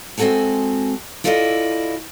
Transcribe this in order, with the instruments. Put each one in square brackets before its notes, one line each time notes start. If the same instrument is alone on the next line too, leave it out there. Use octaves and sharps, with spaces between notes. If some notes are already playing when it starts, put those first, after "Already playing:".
[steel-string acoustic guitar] G#3 C4 F#4 A4 F#5 G#5
E4 F4 A4 B4 D5 D#5